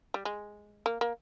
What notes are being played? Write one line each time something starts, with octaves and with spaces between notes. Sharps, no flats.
G3
G#3
A#3
A#3